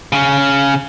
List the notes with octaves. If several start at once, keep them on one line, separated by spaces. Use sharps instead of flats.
C#3 C#4